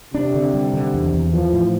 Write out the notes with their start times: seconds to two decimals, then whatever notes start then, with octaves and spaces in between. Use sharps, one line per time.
0.14 C3 D4
0.34 D3
0.54 G3
0.74 D3
0.94 E2
1.14 E2
1.33 E3 F3
1.53 A2